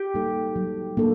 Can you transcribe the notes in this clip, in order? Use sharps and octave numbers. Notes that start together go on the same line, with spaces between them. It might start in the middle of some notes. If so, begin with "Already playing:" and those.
Already playing: G4
G3 A#3 D#4 A4
F#3
A#3 D4 A4